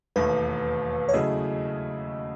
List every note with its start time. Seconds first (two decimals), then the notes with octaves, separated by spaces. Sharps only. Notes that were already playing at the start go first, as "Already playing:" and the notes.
0.16 E1 D#2 D#3 A3 B4
1.09 C#5
1.13 C#3 F#3 A3 E4 G#4 D#5